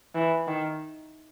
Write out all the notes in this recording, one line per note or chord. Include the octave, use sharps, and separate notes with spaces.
E3
D#3